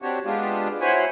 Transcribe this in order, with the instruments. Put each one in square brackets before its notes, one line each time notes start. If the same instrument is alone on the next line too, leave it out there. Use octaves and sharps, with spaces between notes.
[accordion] C4 D4 F#4 G4 C#5
G#3 B3 D4 F4 G4
E4 F#4 C5 C#5 G#5 B5